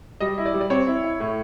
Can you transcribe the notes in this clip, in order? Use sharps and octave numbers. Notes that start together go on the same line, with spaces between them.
G3 D#5
E4
D5
G3
D5
C4 C#5
E4
E4
A2